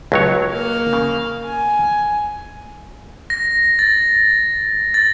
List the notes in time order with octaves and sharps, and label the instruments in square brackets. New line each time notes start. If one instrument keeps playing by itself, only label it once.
[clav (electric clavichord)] C#2 F#3 C#5
[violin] A#3 F5
[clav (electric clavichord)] C#3
[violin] G#5
[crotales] A#6
A6
A6